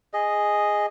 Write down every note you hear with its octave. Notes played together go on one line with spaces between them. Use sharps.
G#4 D#5